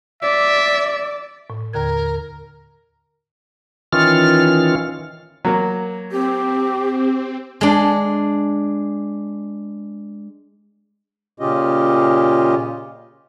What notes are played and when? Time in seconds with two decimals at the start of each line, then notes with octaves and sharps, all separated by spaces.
0.22 D5 E5
1.50 A2
1.73 D#2 D3 A#4 G#6
3.93 D#3 E3 C#4 F4 F6
5.45 F#3 A#3
6.11 C4 G4
7.61 G#3 D4
11.40 A#2 C#3 C#4 F4 G4 D#5